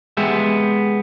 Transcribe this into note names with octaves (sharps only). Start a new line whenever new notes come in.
G#3 B3 G4 E5